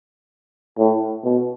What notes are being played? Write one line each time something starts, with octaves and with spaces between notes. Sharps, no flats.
A2
B2